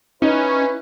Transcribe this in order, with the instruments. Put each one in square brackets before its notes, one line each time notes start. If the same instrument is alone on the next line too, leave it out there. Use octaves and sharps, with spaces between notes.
[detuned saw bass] C#4 [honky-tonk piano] D#4 [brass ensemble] E4 B4